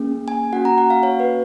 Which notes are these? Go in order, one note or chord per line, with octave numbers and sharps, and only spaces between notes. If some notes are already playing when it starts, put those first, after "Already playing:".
Already playing: A#3 C#4 G#4
G#5
A#3 C#4 F#4 F#5
A#5
F#5
F5
C#5
B4